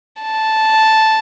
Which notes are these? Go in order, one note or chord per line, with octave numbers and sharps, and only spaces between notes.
A5